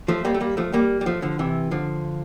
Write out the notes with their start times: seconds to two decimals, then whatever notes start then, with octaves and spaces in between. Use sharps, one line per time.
0.08 F3 A3
0.25 G3 A#3
0.34 A3
0.41 G3 A#3
0.57 F3 A3
0.73 G3 A#3
1.01 G3
1.06 F3 A3
1.22 D3 F3
1.39 C3 E3
1.71 D3 F3